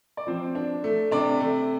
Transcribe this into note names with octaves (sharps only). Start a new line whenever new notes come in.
D5
F3 C4 C5
D4
A3
C3 D4 D5
A3